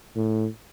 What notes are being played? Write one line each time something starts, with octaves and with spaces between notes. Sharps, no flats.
A2